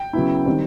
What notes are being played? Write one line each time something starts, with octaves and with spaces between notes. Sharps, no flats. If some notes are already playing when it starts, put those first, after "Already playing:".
Already playing: G5
C#3 F#3 B3 E4
D#3 G3 C4